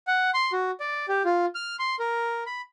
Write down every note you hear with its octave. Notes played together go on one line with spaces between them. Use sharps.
F#5
C6
F#4
D5
G4
F4
F6
C6
A#4
B5